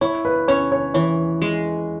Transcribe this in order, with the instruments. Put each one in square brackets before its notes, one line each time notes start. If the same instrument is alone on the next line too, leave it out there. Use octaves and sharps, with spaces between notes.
[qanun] E4 [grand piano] C#5
[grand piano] B4
[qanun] C#4 [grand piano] C#5
[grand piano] C#5
[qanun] E3 [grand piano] C#5
[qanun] G#3